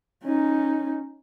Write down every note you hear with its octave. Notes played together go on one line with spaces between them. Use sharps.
C#4 D#4